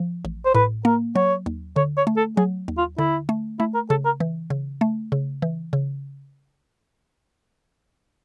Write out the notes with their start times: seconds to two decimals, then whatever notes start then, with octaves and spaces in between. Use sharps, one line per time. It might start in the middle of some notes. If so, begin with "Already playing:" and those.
Already playing: F3
0.25 A1
0.45 C5
0.55 A2 B4
0.85 A#3 A#4
1.16 F#3 C#5
1.46 D#2
1.76 D3 C#5
1.97 C#5
2.07 A3
2.17 A4
2.37 F#3 G#4
2.68 D#2
2.78 F4
2.98 D3 E4
3.29 A3
3.60 A3 E4
3.75 A#4
3.90 C#3 A4
4.06 A#4
4.20 E3
4.50 C#3
4.81 A3
5.12 C#3
5.42 E3
5.73 C#3